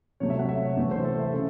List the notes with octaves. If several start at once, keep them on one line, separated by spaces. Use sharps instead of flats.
C3 F#3 A3 C#5
E5
F#5
E5
C#5
C3 E3 A3
C5
A4
E5
C#3 A4